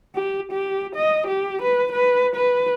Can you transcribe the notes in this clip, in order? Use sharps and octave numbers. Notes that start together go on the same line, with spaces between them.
G4
G4
D#5
G4
B4
B4
B4